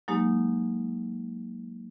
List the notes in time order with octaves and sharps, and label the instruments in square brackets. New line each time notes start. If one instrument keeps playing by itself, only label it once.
[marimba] F#3 G#3 A#3 D#4 G4